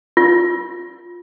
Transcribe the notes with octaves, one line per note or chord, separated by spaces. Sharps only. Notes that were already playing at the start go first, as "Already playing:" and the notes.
F4